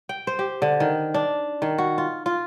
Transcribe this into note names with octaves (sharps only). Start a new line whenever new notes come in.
G5
C5
G4
D3
D#3
D4
D#3
F#4
F4
F4